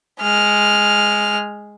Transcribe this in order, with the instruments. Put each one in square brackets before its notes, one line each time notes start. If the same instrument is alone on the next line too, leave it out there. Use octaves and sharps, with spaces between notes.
[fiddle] G#3 F6